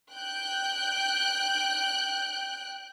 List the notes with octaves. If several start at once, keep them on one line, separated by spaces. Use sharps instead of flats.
G5 F#6 G6